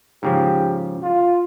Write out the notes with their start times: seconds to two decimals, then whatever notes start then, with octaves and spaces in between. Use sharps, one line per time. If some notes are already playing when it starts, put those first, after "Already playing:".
0.23 G#2 C#3 F3 G4
1.02 F4